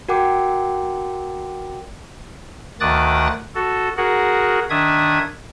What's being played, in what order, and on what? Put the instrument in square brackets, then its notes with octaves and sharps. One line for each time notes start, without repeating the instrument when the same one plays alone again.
[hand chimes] F#4 A#4 F#5 G5 D6
[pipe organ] D2 D#3 D6 D#6 F#6 A6
F#4 A4
F#4 G#4 A#4 F#5
D#3 D4 E5 D#6 G#6